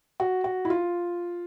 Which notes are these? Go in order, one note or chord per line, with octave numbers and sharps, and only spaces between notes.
F#4
F#4
E4
F4